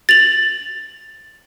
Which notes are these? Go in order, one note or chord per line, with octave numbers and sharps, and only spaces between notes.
A6 F7 F#7